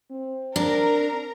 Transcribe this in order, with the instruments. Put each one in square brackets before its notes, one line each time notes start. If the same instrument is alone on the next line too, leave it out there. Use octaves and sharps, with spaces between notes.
[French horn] C4
[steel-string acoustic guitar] D4 [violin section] A#4 A#5